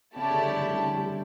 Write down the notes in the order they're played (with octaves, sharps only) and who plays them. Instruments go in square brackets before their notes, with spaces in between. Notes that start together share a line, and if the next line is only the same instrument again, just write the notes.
[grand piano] C#3 [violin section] A3 E4 G4 D5 A5
[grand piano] D3
G3
G3
D3
E3
G3